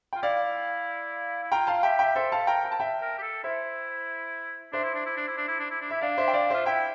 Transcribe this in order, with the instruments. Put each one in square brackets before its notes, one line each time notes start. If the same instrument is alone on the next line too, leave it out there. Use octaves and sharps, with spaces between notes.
[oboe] F4 [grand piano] G5
[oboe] E4 [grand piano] D5 F5
[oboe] E4
[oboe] F4 [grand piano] G5 A#5
[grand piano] F5 A5
[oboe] F4
[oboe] G4 [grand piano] E5 G5
[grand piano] E5 G5
[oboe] A4 [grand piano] C5 E5
[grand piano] F5 A5
[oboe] A#4 [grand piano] G5 A#5
[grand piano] G5
A5
E5 G5
[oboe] A#4
G4
A4
[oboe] E4 [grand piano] C5 E5
[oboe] D4 [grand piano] C5 E5
[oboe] E4
D4
E4
D4
E4
D4
E4
D4
E4
D4
[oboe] E4 [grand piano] E5
[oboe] D4 [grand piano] D5 F5
[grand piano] C5 E5
G5
D5 F5
[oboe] F4 [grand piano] C5 E5
[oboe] E4 [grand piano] E5 G5